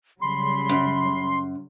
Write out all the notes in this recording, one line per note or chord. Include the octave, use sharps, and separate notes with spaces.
C#3 F#3 G3 B5 C6
F#2